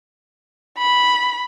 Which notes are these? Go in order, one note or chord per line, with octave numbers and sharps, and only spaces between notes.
B5